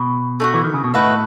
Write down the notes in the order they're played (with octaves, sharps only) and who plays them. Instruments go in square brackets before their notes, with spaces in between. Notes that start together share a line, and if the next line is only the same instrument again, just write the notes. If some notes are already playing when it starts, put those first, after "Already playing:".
Already playing: [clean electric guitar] B2
[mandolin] A3 D#4 F#4
[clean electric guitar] E3
D#3
C#3
B2
[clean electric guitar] A2 [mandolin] D#4 F#4 B4 E5